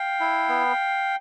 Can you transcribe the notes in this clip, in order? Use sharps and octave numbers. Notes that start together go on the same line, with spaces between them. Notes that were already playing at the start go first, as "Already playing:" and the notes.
Already playing: F5 G5
E4
B3